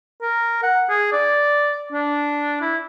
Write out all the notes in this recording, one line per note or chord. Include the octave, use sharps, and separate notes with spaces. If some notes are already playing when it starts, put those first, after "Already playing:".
A#4
F#5
G#4
D5
D4
E4